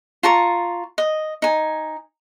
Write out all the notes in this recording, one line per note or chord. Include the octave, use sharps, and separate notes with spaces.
F4 A5 A#5 C#6
D#5
D#4 G#5